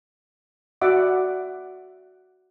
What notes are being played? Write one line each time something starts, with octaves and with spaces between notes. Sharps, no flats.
F#4 D5 E5 F#5 D6